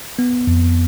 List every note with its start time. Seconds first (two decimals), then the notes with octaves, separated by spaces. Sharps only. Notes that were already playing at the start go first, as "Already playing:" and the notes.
0.19 B3
0.47 F2